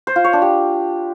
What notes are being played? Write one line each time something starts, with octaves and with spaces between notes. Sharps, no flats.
C5
F4
C#5
D4
G4